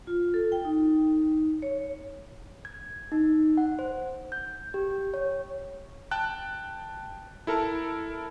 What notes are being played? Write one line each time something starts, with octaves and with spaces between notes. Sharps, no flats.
F4
A4
G5
D#4
C#5
G#6
D#4
F#5
C5
G6
G4
C#5
G5 A5 F#6
E4 A4 A#4 A5